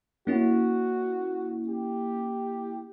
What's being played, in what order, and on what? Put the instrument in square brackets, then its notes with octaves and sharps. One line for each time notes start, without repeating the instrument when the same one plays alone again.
[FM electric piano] A#3 C#4 E4 [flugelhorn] F#4
[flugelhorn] G4